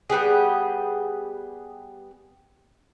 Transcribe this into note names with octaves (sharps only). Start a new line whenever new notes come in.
G3 B3 G4 G#4